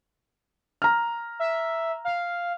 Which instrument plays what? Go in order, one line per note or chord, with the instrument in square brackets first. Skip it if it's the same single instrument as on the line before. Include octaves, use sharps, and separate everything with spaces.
[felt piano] A#5 F6
[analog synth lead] E5
F5